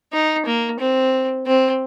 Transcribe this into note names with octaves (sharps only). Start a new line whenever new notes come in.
D#4
A#3
C4
C4